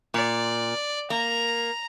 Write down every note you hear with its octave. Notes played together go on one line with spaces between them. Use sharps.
A#2 D5
A#3 A#5